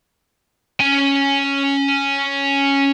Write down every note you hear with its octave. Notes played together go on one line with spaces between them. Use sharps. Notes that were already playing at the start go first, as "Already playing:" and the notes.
C#4 G#5